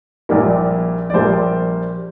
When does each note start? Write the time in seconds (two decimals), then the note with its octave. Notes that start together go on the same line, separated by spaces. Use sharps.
0.29 A#1 A#2 G3 A#3
1.10 D5
1.14 A#1 A#2 G3 A#3 C5